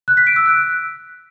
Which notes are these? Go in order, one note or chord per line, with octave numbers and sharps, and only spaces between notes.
F#6
B6
D7
E6
F#6